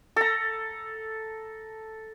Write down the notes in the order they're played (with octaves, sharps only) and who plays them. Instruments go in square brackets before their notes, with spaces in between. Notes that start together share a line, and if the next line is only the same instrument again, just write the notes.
[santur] A4 A#5